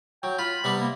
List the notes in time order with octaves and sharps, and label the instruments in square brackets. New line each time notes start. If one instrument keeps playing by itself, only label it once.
[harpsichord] F#3 [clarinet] G5
[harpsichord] F4 [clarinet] B5
[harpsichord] C3 G3 B3
[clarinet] A#3